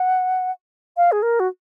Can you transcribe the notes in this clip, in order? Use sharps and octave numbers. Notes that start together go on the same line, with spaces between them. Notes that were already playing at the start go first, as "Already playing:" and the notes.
Already playing: F#5
F5
G#4
A#4
F#4